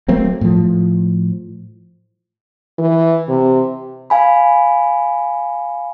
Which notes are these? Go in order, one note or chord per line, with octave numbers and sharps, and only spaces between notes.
F#3 A3 A#3 C4
A2 F3
E3
C3
F5 G#5 B5